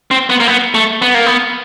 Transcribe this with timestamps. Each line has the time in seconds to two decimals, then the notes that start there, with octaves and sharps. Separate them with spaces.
0.11 C4
0.30 B3
0.40 A#3
0.47 B3
0.75 A3
1.02 B3
1.14 A#3
1.26 B3